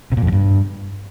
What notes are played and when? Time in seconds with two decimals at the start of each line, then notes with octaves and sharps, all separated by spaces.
0.12 C3
0.17 A#2
0.22 F2
0.27 B2
0.32 G2